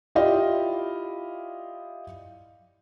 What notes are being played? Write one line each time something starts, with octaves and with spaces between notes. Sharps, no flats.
E4 F4 G4 D5 D#5 F5